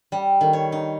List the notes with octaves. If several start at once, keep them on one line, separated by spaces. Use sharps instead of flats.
G3
D#3
C#5
D#4